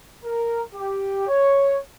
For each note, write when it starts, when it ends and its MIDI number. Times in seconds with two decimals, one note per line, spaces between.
0.24 0.61 70
0.74 1.26 67
1.28 1.79 73